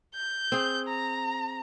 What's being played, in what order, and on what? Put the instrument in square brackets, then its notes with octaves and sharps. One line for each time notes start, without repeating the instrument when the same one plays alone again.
[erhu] G6
[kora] C4 G#4
[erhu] A#5